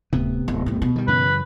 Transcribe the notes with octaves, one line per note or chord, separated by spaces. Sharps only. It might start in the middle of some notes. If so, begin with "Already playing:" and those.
D1 C3 B3
D1
D#1 A2
B2
D#3 G3
F#2 C#3 E3 B4